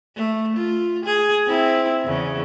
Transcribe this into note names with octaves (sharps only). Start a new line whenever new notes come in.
A3
F4
G#4
C4 E4
E2 C#3